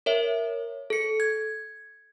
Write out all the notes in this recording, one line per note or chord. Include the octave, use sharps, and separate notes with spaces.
A#4 C#5 E5
A4 C#7
G#6